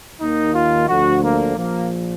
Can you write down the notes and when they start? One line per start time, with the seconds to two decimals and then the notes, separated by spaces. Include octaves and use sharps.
0.20 D#2 D#3 A#3 D#4
0.55 F4
0.88 D2 D3 F3 F#4
1.23 A#3
1.57 A#1 A#2 F3 A#3